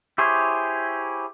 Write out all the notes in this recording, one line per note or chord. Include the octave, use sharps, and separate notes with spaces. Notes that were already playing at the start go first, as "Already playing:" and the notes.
E4 G4 G#4 C5 C#5